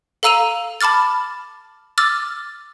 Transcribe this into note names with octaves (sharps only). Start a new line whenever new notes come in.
A4 F5 A#5 E6 D#7 F7
A5 B5 D6 F6 A6
D6 E6 F6 A6